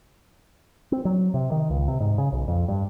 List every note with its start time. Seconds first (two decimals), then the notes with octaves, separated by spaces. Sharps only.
0.92 C4
1.05 F#3
1.34 C3
1.52 D#3
1.70 C#2
1.88 C3
2.00 G#2
2.18 C#3
2.33 B1
2.48 F2
2.68 G2